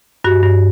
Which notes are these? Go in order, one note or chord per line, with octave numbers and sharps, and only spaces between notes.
G2 F#4
G2